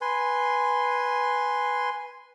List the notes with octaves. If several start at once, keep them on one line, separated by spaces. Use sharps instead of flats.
B4 G#5 C6